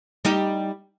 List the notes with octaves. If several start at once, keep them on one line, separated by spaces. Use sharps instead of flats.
G3 D#4 G4